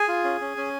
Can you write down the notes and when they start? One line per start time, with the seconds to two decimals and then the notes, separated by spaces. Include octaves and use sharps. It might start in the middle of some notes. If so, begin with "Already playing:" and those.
Already playing: G#4 G#5
0.08 F4
0.24 C#4
0.41 C#4
0.57 C#4